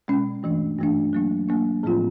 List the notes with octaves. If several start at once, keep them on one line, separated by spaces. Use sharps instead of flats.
B2 G#3 C#4
G2 E3 A3 D4
G2 E3 A3 D4
F#3 A#3 D4
F#3 A#3 D4
A2 F3 A3 C4 F4